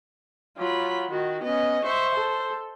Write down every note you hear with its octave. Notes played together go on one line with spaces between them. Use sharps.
F#3 F4 B5
D#3 F#4
B3 C#4 D#5
C5 E5 C#6
A4